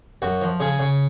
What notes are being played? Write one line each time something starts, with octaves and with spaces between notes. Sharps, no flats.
F#2 F#4
F3
C#3 G#4
C#3